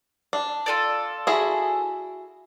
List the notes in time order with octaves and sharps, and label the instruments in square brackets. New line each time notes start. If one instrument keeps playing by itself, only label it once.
[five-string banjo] D4
[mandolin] F4 A4 D5
[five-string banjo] E4 F#4 G#4